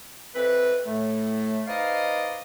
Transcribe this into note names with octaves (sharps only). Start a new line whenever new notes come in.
F2 E3 C4 B4
A2 A3
D#4 B4 C5 D5 D#5 F5